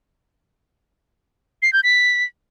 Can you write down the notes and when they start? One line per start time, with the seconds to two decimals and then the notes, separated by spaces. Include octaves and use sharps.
1.62 C7
1.73 G6
1.83 B6